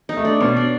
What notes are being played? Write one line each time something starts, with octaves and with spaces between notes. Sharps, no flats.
D#4
A3
D4
B2 C#4
D4